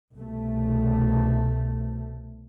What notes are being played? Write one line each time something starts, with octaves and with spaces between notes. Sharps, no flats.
C2 B2 A3